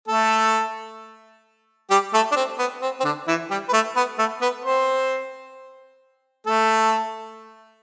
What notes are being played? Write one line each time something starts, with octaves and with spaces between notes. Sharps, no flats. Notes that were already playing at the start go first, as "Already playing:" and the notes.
A3 A4
G3 G4
A3 A4
D4
C4
B3
C4
C4
D3 D4
E3 E4
G3 G4
B4
A3 A4
B3 B4
A3 A4
B3 B4
C4 C5
A3 A4